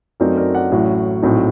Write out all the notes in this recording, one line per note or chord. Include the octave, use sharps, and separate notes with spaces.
F#2 F#3 A3 C4 D#4 A#4 D5
A#4 D5
D5 F#5
A1 A2 F#3
A#1 A2 F#3 C4 D#4